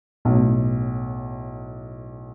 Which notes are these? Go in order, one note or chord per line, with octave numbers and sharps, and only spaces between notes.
B1 A2